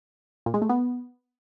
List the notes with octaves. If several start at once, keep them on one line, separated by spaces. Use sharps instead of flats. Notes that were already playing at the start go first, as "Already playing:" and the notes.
A#2
G#3
A3
B3